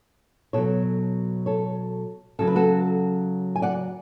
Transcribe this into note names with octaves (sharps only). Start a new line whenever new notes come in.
B2 F#3 A4 C#5
A4 C#5
C#3 F#3 A4
B4
F#4 A4
G#5
D5 F#5